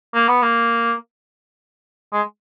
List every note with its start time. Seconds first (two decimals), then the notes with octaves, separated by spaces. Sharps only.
0.14 A#3
0.28 B3
0.42 A#3
2.13 G#3